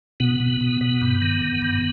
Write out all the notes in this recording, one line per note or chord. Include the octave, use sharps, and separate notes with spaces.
B2 B3
B2
B2
B2
G2
D#3
D#3
G2